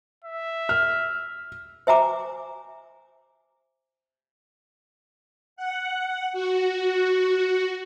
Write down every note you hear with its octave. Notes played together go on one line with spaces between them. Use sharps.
E5
F6
C5 E5 G#5 A#5 D6
F#5
F#4